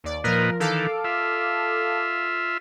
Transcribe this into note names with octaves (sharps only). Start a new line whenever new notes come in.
D#2 D5
A#2 F3 A#4 B4 D#5
D#3 E3 A4 F5 D6
F4 E5